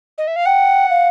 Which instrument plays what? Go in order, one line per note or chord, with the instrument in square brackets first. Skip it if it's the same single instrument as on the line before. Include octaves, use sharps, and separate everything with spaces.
[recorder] D#5
E5
F5
[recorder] F#5 [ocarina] G5
[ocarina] F5